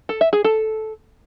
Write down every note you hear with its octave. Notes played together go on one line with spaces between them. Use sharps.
A4
E5
G#4
A4